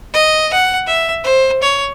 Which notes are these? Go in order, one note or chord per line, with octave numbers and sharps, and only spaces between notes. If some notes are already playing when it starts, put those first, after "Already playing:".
D#5
F#5
E5
C5
C#5